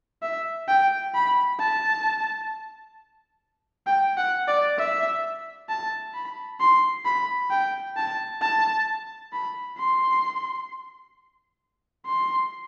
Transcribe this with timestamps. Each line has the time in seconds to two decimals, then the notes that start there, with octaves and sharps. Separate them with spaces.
0.22 E5
0.68 G5
1.15 B5
1.59 A5
3.87 G5
4.17 F#5
4.48 D5
4.78 E5
5.69 A5
6.14 B5
6.60 C6
7.05 B5
7.51 G5
7.97 A5
8.41 A5
9.33 B5
9.78 C6
12.06 C6